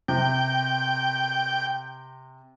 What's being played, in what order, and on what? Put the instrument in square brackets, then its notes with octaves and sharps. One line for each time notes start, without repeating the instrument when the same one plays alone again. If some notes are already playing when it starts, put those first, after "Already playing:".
[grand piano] C3 [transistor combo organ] G5